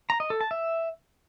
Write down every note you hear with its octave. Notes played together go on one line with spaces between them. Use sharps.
A#5
D#5
A4
A5
E5